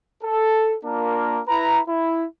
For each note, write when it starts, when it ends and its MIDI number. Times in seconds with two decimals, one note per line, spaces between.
0.23 0.75 69
0.84 1.41 58
0.84 1.41 62
0.84 1.41 65
0.84 1.41 70
1.48 1.79 64
1.48 1.79 71
1.48 1.79 82
1.87 2.25 64